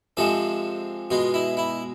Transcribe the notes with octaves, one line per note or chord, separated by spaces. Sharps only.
C3 F3 G#3 A4
B2 G#3 F4
E4
E4